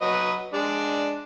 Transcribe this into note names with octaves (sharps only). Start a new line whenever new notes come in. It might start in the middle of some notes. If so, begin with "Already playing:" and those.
F#3 B4 D#5
G#3 D4 D5